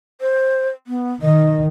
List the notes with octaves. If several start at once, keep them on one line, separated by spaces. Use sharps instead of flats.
C5
B3
D#3 D#5